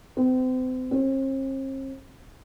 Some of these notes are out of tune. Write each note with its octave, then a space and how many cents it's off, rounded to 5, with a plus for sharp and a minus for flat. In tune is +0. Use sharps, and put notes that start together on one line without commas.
C4 -35
C4 +45